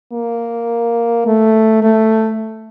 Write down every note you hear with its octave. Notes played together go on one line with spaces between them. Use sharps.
A#3
A3
A3